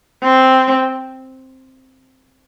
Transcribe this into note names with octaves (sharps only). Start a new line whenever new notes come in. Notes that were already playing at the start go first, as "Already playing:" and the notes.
C4